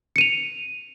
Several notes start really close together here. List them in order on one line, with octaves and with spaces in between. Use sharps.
C#7 D#7 F7